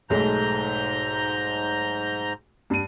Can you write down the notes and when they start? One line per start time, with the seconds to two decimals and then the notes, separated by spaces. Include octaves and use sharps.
0.10 B1 G#2 G#3 A3 A#5 G6
2.70 G2 D#7